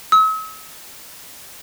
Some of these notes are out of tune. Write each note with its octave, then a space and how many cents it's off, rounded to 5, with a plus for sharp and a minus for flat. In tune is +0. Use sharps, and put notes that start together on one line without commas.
E6 -45